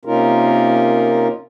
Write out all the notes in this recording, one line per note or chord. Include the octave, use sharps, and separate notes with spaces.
C3 A#3 C#4 D#4 F4 A#4